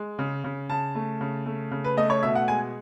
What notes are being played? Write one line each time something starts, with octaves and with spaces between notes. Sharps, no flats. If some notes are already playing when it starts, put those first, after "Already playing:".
Already playing: G#3
C#3
C#3
C#3 A5
A3
C#3
A3
C#3
B4
A3 D#5
C#5
B2 E5
F#5
G#3 G#5